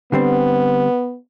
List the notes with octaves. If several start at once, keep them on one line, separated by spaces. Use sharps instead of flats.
D3 G3 B3 C4